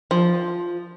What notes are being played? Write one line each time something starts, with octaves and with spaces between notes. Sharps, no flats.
F3